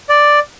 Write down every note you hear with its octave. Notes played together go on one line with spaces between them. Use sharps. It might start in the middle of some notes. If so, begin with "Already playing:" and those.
D5